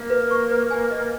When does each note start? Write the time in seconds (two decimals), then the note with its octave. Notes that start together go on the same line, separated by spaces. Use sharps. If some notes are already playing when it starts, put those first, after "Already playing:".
Already playing: A#3 E5
0.10 B4
0.31 C#6
0.50 B4
0.71 G#5
0.91 D#5